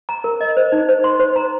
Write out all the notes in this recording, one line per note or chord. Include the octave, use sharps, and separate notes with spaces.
A#5
A#4
D#5
C5
D#4
C5
C6
C5
A#5